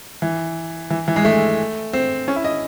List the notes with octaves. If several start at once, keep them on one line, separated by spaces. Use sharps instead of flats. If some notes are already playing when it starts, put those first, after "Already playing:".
E3
E3
E3
G#3
A3
C4
C#4
E4
D#5